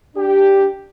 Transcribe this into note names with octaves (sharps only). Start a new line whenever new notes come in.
D4 G4